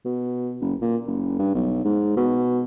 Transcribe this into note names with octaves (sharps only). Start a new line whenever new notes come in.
B2
F#1
A#2
F#1
G2
B1
G#2
B2